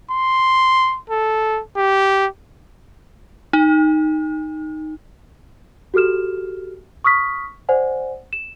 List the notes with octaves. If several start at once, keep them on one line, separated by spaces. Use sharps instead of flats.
C6
A4
G4
D#4
F#4 G4 A4 F6 E7
C#6 D#6 F6 B6
C5 D5 F#5 G#5
E7